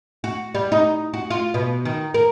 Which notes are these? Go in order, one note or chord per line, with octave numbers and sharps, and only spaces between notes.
F#4
G3
D#4
F#4
F4
B2
D#3
A#4